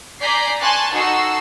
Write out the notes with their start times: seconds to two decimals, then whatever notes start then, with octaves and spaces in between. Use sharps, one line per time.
0.20 D5 G#5 A#5 G6 B6 C7
0.60 G#5 A5 C6 C#6 F#6 A6
0.93 D#4 F#4 A4 E6 C7